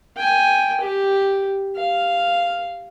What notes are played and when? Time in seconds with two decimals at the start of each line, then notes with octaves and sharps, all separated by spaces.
0.17 G5 G#5
0.80 G4
1.76 F5